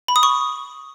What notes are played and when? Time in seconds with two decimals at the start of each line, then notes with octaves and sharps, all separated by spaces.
0.08 B5
0.16 D#6
0.23 C#6